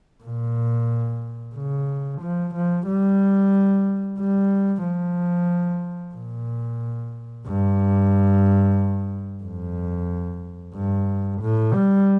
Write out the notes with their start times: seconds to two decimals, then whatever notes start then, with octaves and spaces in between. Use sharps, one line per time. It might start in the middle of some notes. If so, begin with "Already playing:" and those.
0.24 A#2
1.55 C#3
2.21 F3
2.54 F3
2.86 G3
4.19 G3
4.84 F3
6.15 A#2
7.46 G2
9.43 F2
10.75 G2
11.41 A2
11.74 G3